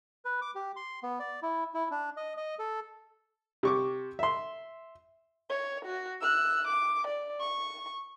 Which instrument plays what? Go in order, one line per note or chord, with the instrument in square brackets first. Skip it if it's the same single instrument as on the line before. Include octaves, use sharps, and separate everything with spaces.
[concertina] B4
D6
G4
C6
B3
D5
E4
E4
D4
D#5
D#5
A4
[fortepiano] C3 C#6 D6
E5 C6
[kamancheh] C#5
F#4
E6 F#6
D6
D5
C#6